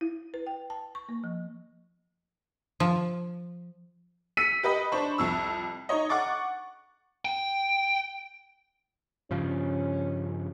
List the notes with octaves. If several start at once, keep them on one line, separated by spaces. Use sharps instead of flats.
E4
B4
G5
A5
C#6
A#3
F3
F3
E6 B6 C#7 D#7
G4 B4 D#5 B5
D4 C5 B5 C#6
C2 F2 E6
D#4 C#5 D#5
F#5 C#6 D6 A6
G5
G2 C#3 F3 C#4